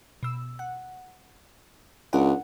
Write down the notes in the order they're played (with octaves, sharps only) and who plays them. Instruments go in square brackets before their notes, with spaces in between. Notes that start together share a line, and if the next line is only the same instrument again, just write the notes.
[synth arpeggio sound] B2 E6
F#5
[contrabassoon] C#2 [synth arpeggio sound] D4 A#4 F#5